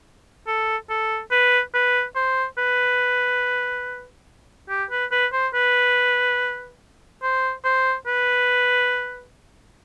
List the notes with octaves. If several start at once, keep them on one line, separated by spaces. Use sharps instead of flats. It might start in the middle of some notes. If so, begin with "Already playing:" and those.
A4
A4
B4
B4
C5
B4
G4
B4
B4
C5
B4
C5
C5
B4